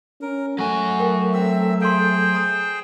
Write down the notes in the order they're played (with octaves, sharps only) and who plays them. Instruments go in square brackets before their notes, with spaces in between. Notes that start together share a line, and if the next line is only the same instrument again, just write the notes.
[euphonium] C#4 [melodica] A#4
[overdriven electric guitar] F#3 G#5 [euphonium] A3 [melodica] F#4
[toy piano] A#4 G5
[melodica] C4 E5 E6
[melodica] G#4 C5 G5 [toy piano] F5 C6
[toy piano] A#5 D#6